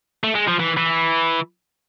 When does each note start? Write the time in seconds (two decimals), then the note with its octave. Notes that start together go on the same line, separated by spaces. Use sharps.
0.24 A3
0.35 G#3
0.47 F3
0.59 E3
0.77 E3